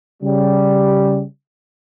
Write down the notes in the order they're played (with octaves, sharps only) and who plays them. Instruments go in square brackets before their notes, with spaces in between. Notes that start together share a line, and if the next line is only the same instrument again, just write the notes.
[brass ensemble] C#3 G3